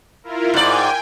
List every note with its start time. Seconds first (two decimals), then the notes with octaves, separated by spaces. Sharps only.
0.24 E4 F4 A#4
0.54 G#2 D5 G5 G#5